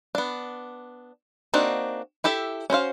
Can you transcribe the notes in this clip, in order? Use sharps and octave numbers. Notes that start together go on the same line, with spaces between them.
B3 D4
A#3 C4 D4 D#4 F#4
E4 G4 A4 E5
C#4 F#4 C5 F5